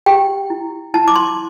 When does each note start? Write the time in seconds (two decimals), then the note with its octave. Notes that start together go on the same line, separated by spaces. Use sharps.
0.06 G4 G5
0.50 E4
0.94 E4 A5
1.08 D6
1.16 C6